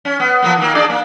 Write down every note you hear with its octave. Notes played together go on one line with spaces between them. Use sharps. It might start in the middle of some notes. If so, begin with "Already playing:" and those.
C#4
B3
F3 A#3 B3
D#3 A#3
D4 G#4 D5
A#3